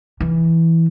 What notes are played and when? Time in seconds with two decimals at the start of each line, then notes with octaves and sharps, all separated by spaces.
0.20 E3